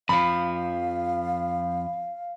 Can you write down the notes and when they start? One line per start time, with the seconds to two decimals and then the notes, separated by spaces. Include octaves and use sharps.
0.09 F2 F3 F5 B5